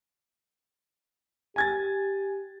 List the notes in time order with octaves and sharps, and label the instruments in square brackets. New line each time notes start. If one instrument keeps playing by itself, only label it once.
[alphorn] G4 [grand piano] G#5 G#6 A6